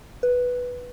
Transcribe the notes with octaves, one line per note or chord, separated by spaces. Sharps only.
B4